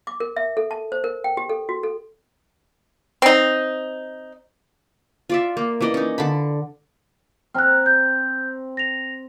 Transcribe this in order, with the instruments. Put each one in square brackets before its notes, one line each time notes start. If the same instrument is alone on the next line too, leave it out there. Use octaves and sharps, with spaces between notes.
[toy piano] D6
A#4
E5
A4
A5
C5
A#4
G5
G4
A4
F#4
A4
[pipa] C4 D#4
[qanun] F4 D5 E5
A#3
E3 C#4 D5 D#5
C#4 D#4
D3 A5 B5
[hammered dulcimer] C4 A#5 [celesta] F6 F#6
[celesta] G6
A#6 F7